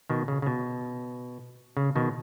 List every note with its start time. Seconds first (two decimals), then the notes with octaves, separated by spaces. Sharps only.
0.10 B2 D#3
0.28 C#3
0.42 C#3
0.46 B2
1.77 C#3
1.96 B2 D#3